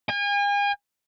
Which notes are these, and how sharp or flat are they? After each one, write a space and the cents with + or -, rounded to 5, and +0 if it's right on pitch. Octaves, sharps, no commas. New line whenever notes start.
G#5 -40